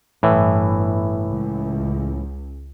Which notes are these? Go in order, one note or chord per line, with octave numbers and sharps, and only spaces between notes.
G1 A2 E3
C#2